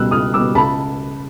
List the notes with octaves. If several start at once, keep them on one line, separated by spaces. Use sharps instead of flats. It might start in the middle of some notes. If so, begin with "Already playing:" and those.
Already playing: C#2 B2 G3 E6 F#6
C#2 D#6 F6
B2 G3 D6 E6
C#2 A5 B5